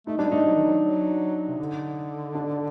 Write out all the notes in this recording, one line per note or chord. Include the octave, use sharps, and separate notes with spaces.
A3 D#4
G3 D4
A3 D#4
F#3
D#3
F#3
F#3
C3
D3
D4